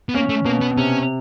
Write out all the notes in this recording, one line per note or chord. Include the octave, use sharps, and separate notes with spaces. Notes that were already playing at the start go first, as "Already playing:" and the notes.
B3
A#3 C#4
A3
B2 A#3
B3
C3 C#4